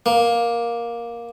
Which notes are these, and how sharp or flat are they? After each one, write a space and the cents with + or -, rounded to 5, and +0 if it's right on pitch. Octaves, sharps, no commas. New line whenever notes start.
A#3 +10